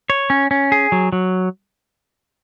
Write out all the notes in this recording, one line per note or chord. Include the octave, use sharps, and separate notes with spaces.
C#5
C#4
C#4
G#4
F#3
F#3